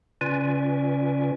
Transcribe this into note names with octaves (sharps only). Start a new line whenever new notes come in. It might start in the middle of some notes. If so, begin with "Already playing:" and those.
C#3 C#4 F4 B4 D5 G#5